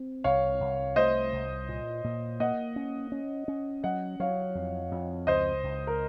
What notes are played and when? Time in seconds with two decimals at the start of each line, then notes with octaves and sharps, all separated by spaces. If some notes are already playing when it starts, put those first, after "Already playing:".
Already playing: C4
0.24 C2 C#5 F5
0.61 C2
0.96 A3 C5 D#5
1.33 C2
1.69 A#2
2.04 A#2
2.40 A#3 D#5 F#5
2.76 C#4
3.12 C#4
3.48 C#4
3.83 F#3 D#5 F#5
4.20 F#3 C#5 F5
4.55 F2
4.91 F2
5.27 C#2 C5 D#5
5.63 C#2
5.87 A#4